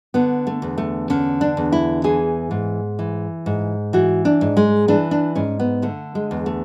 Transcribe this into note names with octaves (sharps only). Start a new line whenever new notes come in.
D3 B3
A3
E2
A3
D3 C#4
D4
E2
E4
E3 G#4
G#2
E3
G#2
E3 F#4
D4
G#2
G#3
E3 D4
D4
G#2 C#4
B3
D3 A3
G#3
E2
A3